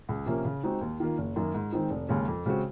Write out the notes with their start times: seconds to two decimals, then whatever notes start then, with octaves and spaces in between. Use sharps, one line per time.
0.09 C#2
0.26 C3 F3 A#3 C#4
0.45 C#3
0.63 G#3 C4 D#4 F#4
0.81 D#2
1.00 D#3 A#3 F4
1.18 F#1
1.36 F#2 D#3 A#3
1.54 G#2
1.72 D#3 G#3 C4 D#4
1.91 F1
2.09 D#2 C#3 G#3 C#4
2.27 F2
2.46 C#3 G#3 C4 F#4